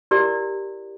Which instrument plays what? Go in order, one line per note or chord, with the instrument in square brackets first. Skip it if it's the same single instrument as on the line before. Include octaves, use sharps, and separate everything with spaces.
[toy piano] E4 G4 A#4 D5